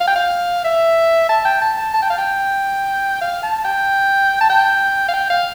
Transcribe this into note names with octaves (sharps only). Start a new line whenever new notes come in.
F5
G5
F5
E5
A5
G5
A5
A5
A5
G5
F5
G5
F5
A5
G5
A5
G5
F5
G5
F5